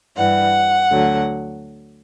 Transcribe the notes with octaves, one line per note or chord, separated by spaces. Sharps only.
G2 E3 G3 F#5
D2 D3 F#3